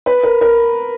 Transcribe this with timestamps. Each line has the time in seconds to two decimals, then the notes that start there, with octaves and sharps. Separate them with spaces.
0.06 B4
0.23 A#4
0.41 A#4